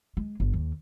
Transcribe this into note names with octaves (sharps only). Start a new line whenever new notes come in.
G#3
G1
D#2